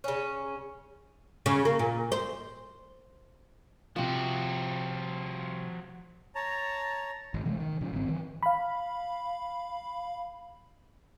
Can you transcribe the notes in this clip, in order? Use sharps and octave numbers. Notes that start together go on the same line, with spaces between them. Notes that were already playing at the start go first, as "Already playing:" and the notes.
C#3 C#4
C#3
A#3
A#2
C5
C3 F3 F4 F#4
C#5 A5 A#5
G#1
C3 E3 G#3 A3
D#3
A2 C#3 F3
G#1 G2 C4
D#3 E3
F5 B5